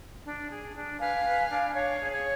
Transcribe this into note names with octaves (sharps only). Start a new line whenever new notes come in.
D4
G#4
D4
B4 F5 G#5
B4
D4
D4 C#5 F5
G#4
C#5